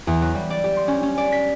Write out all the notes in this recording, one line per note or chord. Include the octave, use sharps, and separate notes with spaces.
E2
F#3
G3
D5
G4
C6
C#4
C#4
D5
B6